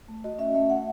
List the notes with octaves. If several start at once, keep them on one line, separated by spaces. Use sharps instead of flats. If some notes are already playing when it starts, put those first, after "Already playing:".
A3
F#4 D#5
C#4 E5
A3 E5
A3 F#5